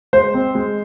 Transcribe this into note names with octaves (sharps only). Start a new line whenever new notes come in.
G#3 C5
C4
G#3